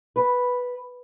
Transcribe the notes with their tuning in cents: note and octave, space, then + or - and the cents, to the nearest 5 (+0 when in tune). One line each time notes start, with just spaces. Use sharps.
B4 -5